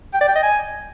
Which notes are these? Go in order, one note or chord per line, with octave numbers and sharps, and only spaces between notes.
G5
D5
G5
D#5
G#5